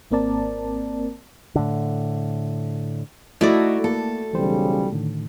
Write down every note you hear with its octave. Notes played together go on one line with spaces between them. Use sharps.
G#1 A#3 C4 A#4 D5 A5
A2 D3
A3 D#4 E4 F#4 D5 D#5
A#3 A4
B1 C#3 E3 G3 C5
A2 D3 D#3